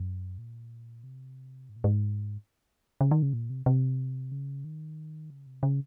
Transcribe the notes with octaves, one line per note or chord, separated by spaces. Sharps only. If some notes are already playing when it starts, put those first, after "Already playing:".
Already playing: F#2
A#2
C3
G#2
A#2
G#2
C#3
D#3
C#3
A#2
C3
C3
C#3
D#3
C#3
C3
C#3